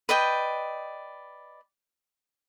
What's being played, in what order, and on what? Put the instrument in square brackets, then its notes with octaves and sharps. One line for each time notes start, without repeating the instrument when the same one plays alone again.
[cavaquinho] B4 D5 D#5 G5